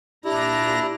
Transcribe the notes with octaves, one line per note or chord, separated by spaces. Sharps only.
A#2 D4 E4 G4 A#5 A#6